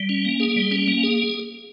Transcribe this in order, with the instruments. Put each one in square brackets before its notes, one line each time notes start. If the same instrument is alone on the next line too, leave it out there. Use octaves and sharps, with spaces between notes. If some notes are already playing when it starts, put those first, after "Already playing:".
Already playing: [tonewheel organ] G3
C#4
A#3
G#4
G3
C#4
A#3
G#4